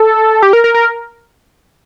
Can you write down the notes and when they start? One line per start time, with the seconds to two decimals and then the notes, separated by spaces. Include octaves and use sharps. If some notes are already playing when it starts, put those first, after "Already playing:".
Already playing: A4
0.42 G4
0.53 A#4
0.64 A#4
0.74 A#4